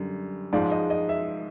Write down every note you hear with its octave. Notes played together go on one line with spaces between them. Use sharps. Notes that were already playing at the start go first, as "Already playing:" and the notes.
Already playing: F#2 D3 G3
G#2 F3 G#3 D5
D#5
D#5
E5